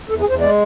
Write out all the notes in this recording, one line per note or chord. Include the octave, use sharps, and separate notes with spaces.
E2 A4
G#4
E2 C5
G#3 D5